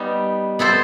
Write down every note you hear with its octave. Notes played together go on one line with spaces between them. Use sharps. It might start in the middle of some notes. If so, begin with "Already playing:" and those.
Already playing: G3 B3 D#4
B3 E4 A4 C5